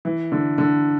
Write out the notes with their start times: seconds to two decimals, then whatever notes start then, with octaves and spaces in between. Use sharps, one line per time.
0.05 E3
0.32 D3
0.58 D3